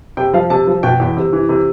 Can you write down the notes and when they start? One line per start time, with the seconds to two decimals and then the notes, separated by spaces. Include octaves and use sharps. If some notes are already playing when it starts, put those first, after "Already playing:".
0.17 C3 G5
0.33 F3 F5
0.50 C3 A5
0.67 F3
0.83 B2 G5
1.00 E2
1.17 C3
1.33 E3
1.49 C3